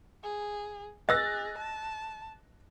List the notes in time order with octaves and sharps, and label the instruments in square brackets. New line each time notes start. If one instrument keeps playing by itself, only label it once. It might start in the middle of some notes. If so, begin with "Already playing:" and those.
[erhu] G#4
[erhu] G#4 [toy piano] D#5 E6 [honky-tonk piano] F#6 A6 A#6
[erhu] A5